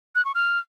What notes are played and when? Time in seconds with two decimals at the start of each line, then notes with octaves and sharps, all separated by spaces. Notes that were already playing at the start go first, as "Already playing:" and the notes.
0.15 F#6
0.25 C#6
0.35 F6